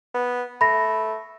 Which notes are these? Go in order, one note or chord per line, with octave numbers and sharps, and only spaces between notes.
B3
A3 B5 A#6